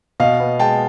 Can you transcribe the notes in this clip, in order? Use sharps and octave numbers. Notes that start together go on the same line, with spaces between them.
B2 D#5 F5
B3
G#3 G5 A5